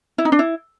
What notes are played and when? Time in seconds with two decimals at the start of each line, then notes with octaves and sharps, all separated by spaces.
0.18 E4
0.25 D#4
0.32 D4
0.39 E4